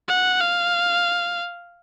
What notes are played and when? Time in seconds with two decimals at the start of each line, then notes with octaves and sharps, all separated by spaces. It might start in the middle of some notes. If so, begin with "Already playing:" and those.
0.08 F#5
0.40 F5